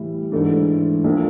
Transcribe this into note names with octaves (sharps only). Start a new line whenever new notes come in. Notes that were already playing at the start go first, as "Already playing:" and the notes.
Already playing: A2 E3 G3
G#2 E3 A3 D4
A#1 A#2 F3 A3 D4